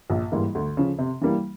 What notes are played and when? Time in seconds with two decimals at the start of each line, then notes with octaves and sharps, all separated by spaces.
0.10 A#1
0.32 G#2 E3 G3 A#3
0.55 D2
0.77 C#3 F3
0.99 C3
1.21 E3 G3 A#3